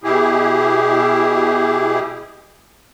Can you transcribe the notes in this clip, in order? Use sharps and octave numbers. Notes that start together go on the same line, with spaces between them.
B2 E4 G4 G#4